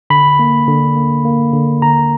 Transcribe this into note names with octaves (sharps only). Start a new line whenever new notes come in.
D3 B5
A#3
D3
A#3
A#3
D3
D3 A#5